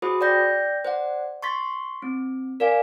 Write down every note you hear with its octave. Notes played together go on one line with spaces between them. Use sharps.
F#4 G#4 C5 B5 D#6
D5 G5 G6 A#6
C5 D5 F#5
C6 C#6 A6 B6
C4
A#4 D5 F5 G#5